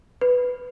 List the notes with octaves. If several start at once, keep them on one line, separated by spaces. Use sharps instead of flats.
B4